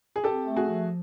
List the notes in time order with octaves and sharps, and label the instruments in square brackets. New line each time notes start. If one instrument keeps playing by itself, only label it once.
[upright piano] G#4
[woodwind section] C4 [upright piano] G4 A4
[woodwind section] A3
[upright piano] F#4 G#4
[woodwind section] F3